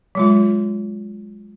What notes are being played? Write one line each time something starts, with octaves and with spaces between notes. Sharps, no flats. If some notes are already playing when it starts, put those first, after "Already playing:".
F#3 G#3 F4